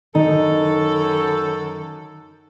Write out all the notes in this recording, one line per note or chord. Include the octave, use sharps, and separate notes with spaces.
F#2 D#3 D#4 A4